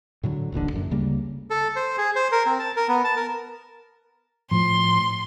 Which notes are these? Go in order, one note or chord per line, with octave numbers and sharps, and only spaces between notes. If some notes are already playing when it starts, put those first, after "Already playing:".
A2 D3 F#3
D#1 A1 D#2 D3
F#1 F#2
D2 C#3 G3 A#3
A4
C5
G#4
C5
A#4
C4
A5
A#4
B3
A5
A#4
A2 F3 C6